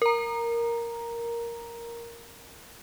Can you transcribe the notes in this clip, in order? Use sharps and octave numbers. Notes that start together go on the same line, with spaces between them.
A#4 A#5